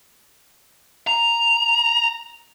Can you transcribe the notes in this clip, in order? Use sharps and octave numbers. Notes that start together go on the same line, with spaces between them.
A#5